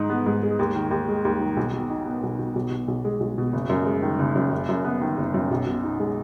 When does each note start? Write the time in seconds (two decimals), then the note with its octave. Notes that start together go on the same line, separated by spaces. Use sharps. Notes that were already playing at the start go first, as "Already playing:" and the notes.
Already playing: G#2 G#3 D#4
0.10 B3
0.26 G#2
0.43 G#3
0.59 D#2
0.75 D#3
0.91 D#2
1.08 G#3
1.25 D#2
1.40 D#3
1.57 B1
1.73 B2
1.90 D#4
2.06 B3
2.23 B1
2.39 B2
2.55 B1
2.71 B2
2.88 B1
3.04 G#3
3.20 B1
3.38 B2
3.53 F#1
3.69 F#2
3.86 G#3
4.02 D#3
4.19 F#1
4.36 F#2
4.52 F#1
4.69 F#2
4.84 B3
5.01 D#3
5.18 F#1
5.34 F#2
5.51 B1
5.66 B2
5.83 D#4
6.00 G#3